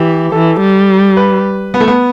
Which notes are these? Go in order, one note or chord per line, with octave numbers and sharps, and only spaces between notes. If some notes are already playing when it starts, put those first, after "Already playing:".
Already playing: E3 G4
E3 A4
G3
B4
B3
A3
B3